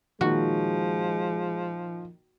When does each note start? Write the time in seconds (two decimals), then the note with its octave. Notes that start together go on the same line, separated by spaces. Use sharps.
0.21 A#2 D#3 F3 G#3 F#4